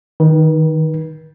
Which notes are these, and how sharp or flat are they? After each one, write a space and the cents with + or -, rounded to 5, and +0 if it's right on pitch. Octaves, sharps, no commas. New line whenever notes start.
D#3 +0 B4 -40